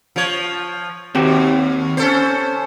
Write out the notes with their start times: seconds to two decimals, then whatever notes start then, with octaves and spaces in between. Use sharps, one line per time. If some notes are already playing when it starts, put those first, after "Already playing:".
0.16 F3 C#5
1.15 D#2 C4 F#4 G4
1.97 C#4 A4 C5